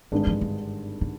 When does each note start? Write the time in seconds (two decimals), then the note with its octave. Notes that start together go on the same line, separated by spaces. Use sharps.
0.12 G#1 G2 D3 D#3 G#3 D4
0.27 F3
0.41 D#3
1.01 D3